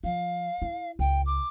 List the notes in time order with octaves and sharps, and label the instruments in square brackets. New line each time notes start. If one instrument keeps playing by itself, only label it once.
[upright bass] F3 [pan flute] F5
[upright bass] E4
[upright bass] C#2 [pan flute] G5
[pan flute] D6